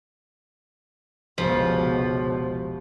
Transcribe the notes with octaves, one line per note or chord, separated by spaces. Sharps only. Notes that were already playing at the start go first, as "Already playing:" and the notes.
F1 C#2 B2 F3